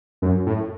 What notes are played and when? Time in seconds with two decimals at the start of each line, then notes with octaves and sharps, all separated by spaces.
0.22 F#2
0.46 A2